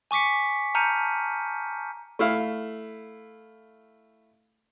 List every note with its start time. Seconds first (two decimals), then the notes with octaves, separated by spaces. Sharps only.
0.11 G#5 C#6 D6 B6 C#7
0.75 A5 A#5 F6 G6 C#7 D#7
2.19 A3 E4 F5